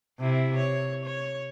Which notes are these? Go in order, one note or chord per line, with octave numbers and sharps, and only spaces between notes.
C3 E4
C#5
C#5